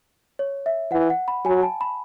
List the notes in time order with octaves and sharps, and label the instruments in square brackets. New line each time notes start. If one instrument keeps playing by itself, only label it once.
[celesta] C#5
E5
[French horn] E3 [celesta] F#5
[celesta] F#5
B5
[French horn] F#3 [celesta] G#5
[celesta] A5
B5